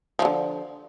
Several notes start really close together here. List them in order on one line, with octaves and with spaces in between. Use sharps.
F3 E3 D3